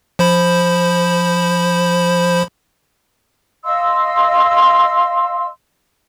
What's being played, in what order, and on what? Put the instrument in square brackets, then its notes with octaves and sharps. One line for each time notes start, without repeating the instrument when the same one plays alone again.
[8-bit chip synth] F3 C5 B5
[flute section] D#5 F5 C6 E6